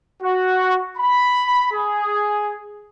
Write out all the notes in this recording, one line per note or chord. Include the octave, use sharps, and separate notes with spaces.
F#4
B5
G#4